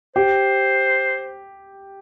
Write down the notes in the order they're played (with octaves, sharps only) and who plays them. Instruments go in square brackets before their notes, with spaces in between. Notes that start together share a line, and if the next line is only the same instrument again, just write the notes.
[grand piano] G4 [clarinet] C5